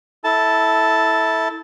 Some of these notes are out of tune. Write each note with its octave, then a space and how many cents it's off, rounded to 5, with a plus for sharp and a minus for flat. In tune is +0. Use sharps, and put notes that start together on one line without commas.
E4 -20 A4 +0 A5 +0